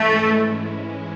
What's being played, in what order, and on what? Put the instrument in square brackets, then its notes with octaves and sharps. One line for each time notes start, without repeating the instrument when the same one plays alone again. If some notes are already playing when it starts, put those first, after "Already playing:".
Already playing: [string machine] G#2 E3 G#3 C#4 E4 [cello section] A3